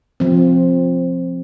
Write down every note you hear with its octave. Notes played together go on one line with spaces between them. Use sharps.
F3 C4